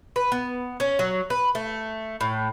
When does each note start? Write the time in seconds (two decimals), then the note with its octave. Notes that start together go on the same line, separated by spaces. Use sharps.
0.16 B4
0.32 B3
0.80 C#4
0.99 F#3
1.30 B4
1.55 A3
2.21 A2